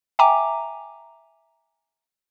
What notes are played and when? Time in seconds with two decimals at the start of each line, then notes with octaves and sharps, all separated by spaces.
0.19 E5 G5 G#5 A#5 D6